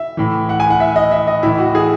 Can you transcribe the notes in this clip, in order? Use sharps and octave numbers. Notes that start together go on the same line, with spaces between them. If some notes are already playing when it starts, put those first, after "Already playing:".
Already playing: E5
A2 E3
F#5
G#5
F#5
E5
D#5
E5
D#5
A2 E3 E4
F#4
G#4